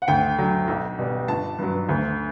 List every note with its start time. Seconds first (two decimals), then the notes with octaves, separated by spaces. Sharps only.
0.02 F#5
0.08 D2 G5
0.38 D3 F#3
0.68 B1
0.99 B2 G3
1.28 G1 A5
1.59 G2 F#3
1.89 D2